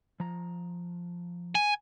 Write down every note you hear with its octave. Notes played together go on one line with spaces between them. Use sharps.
F3 A#5
G#5